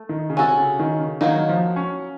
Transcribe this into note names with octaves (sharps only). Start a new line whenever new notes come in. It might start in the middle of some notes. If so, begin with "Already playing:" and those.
Already playing: A3
D#3
C#3
C3 C#4 F#4 A4
C#3
D#3
C#3
D#3 F#3 A#3 D#4
F3
C#4